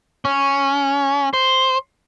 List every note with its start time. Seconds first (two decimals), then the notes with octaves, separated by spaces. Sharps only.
0.25 C#4
1.34 C5